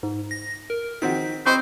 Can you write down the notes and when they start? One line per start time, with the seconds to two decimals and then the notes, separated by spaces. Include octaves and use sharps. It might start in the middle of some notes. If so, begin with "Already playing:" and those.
0.03 G#2
0.31 A#6
0.70 A#4
1.02 D#3 C4 F#4 B6
1.46 C4 C5 D#5 B5 C#6